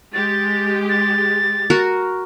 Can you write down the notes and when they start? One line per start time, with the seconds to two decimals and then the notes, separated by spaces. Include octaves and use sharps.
0.14 G#3 G4 A6
0.89 A6
1.70 F#4 A#4